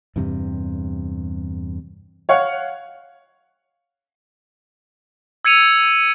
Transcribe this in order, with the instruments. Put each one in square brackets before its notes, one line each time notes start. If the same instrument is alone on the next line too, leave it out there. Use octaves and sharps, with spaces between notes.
[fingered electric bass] E2 G2 C3
[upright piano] C#5 F5 F#5
[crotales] E6 G#6 C#7 D#7 F7